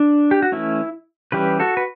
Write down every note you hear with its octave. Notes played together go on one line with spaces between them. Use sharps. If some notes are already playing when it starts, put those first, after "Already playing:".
Already playing: D4
G4
F#4
E3 A3 C#4 E4
E3 G3 C#4 G4 B4
F#4 A4
B4